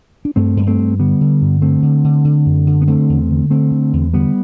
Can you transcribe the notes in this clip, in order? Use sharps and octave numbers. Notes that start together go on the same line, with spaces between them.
D4
G2 A3 C4
G2
A3 C4
G2
D3 G3 B3
D3
G2
D3 A3 C4
D3
D3
D3
F#2
D3
B3
D3 A3 C4
E2
D3
D3 A3 C4
D3
E2
D3 G3 B3